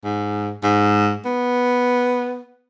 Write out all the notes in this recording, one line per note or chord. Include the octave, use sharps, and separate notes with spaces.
G#2
G#2
B3